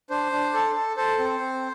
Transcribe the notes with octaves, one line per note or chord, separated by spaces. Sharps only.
D4 C5
D4
A4
A4
A4 C5
C4
C4